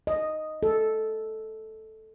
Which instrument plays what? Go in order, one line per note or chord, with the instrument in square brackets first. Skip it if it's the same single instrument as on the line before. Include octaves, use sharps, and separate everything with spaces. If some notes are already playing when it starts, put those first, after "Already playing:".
[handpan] D#5
A4